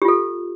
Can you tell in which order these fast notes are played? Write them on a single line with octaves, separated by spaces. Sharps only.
G4 F4 A4